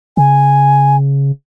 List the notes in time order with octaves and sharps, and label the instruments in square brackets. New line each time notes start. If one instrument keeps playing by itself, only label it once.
[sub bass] C#3 [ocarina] G#5